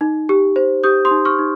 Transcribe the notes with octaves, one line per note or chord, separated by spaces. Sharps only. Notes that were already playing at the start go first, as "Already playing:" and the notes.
D#4
G4
C5
G4 D#6 G6
C6 D#6
D#4
C#6 F6
D#4